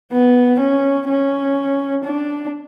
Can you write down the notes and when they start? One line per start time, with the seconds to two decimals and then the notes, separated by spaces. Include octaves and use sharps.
0.12 B3
0.60 C#4
1.09 C#4
2.04 D4